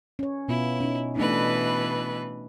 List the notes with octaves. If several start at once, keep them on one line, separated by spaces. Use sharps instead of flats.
C#4 C#5
B2 B3 E4 F4
C#4 D#4
B2 E3 A3 D4 D#4 B4